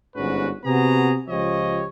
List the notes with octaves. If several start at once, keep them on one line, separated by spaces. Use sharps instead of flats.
G1 G#2 C#4 F#4 B4
C3 B3 F#4 G#4 A#5
C#2 F3 G4 C#5 D#5